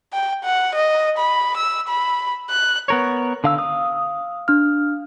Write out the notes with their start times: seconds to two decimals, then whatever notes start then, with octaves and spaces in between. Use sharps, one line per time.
0.13 G5
0.44 F#5
0.75 D#5
1.18 B5
1.57 E6
1.88 B5
2.50 F#6
2.88 B3 A#4 C#5
3.44 D3 F5 E6
3.58 F5 D#6
4.48 D4 F6